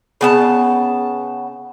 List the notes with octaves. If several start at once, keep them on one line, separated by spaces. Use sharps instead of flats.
C#3 B3 A5